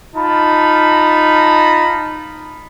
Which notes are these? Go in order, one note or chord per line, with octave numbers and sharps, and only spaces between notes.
D#4 F4 A5 B5